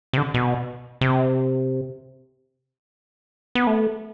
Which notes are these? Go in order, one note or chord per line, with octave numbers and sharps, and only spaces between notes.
C3
D3
B2
C3
B3
A3